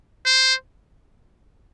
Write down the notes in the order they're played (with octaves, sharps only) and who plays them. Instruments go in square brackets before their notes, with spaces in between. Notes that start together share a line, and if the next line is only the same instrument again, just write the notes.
[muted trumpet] C5